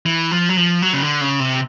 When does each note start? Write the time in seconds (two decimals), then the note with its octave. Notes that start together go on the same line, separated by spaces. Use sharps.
0.06 E3
0.31 F3
0.49 F#3
0.57 F3
0.82 F#3
0.93 C#3
1.02 D3
1.21 C#3
1.40 C3